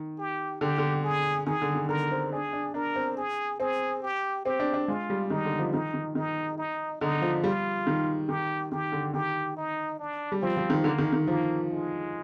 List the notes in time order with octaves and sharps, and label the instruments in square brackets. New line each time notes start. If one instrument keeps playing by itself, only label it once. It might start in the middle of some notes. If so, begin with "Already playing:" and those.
Already playing: [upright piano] D#3
[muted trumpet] G4
[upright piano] D3 [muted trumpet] G4
[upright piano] D3
[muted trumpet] G#4
[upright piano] D#3 [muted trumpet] G#4
[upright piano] D3
D#3
[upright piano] D3 [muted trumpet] A#4
[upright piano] C4
[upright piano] D4 [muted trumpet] G#4
[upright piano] D4
[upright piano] D4 [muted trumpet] A#4
[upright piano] C4
[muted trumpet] G#4
[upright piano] C4 [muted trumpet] G#4
[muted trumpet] G4
[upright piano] C4 [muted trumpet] G4
[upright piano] D4
D4
[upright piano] G#3 [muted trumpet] F4
[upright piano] G3
[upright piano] D#3 [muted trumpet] D#4
[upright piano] D3
F3
[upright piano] D#3 [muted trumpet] D#4
[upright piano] D#3
[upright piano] D#3 [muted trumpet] D#4
[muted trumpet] D#4
[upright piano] D3 [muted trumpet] D#4
[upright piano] F3
[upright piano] G3 [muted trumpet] F4
[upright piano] D#3
[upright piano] D#3 [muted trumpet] G4
[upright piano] D#3 [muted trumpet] G4
[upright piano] D3
[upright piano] D#3 [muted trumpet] G4
[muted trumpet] D#4
D4
[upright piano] G3
[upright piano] F3 [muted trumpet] C4
[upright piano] F3
D#3
[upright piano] D3 [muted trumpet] A#3
[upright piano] D#3
D#3
[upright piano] F3 [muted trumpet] A#3
[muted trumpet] G#3